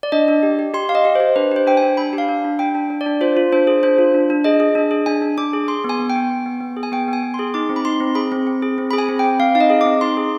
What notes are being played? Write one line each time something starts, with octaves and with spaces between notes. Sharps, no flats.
D5
D4 D#5
D4
G4
G4
G4 C6
G4 F5
D#5
G4
C5
G4
D4 B4
G4 C5
D4 G5
G#5
D4
D4 B5
G4
F5
D4
D4
D4 G5
D4
D4
D5
D4
F4 C5
F4
D4 C5
G#4
D4 C5
F4
D4
D4
G#4 D#5
G#4
D4
G#4
D4 G#5
D4
D4 D6
G#4
G#4 C6
B3 G#5
B3
G5
B3
B3
B3
B3
G#4
G#5
B3 G5
B3 G#5
B3
C6
G#4
D#4 D6
C4
B5
D#4 C6
C4
G#4 B5
C4
C4
G#4
C4
B5
G#4
G#5
C4
G5
C4
C4 F5
D#4 F5
D#5
G#4
D6
C4
D#4 C6
G#4